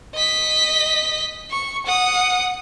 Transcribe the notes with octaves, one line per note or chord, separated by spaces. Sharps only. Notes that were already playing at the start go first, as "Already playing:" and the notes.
D#5 B6
C#6
F#5 D#6